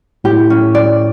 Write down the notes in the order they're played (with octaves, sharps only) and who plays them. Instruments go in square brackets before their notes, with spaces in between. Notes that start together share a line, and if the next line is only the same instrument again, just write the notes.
[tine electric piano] A2 [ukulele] G4
[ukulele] C#4
D5